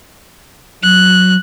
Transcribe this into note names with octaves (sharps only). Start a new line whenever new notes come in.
F#3 F#6